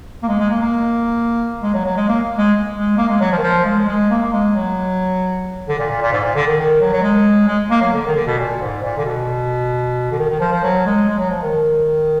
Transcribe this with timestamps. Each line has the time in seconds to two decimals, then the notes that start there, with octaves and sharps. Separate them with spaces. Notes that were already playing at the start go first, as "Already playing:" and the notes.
0.22 A#3
0.28 G#3
0.39 G#3
0.50 A#3
0.61 A#3
1.62 G#3
1.74 F#3
1.85 F#3
1.96 G#3
2.08 A#3
2.38 G#3
2.75 G#3
2.97 A#3
3.08 G#3
3.20 F#3
3.32 F3
3.37 D#3
3.43 F3
3.65 G#3
3.88 G#3
4.10 A#3
4.23 A#3
4.33 G#3
4.55 F#3
5.68 D3
5.79 A#2
5.90 A#2
6.01 A#2
6.12 G#2
6.23 A#2
6.35 D3
6.46 D#3
6.58 D#3
6.80 F#3
6.92 F#3
7.02 G#3
7.47 G#3
7.70 A#3
7.81 F#3
7.93 D3
8.06 D#3
8.15 D3
8.26 B2
8.38 A#2
8.60 G#2
8.83 A#2
8.97 D3
9.05 B2
10.11 D3
10.18 D#3
10.29 D#3
10.40 F3
10.51 F3
10.63 F#3
10.86 G#3
11.08 G#3
11.19 F#3
11.30 F3
11.41 D#3